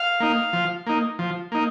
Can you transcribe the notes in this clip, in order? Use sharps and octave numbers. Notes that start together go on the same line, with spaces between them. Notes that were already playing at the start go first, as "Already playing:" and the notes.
Already playing: F5
A#3 D#4
F3
A#3 D#4
F3
A#3 D#4